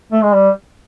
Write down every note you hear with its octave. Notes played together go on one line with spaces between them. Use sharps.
A3
G#3
G3